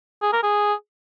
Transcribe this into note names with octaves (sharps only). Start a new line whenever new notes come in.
G#4
A#4
G#4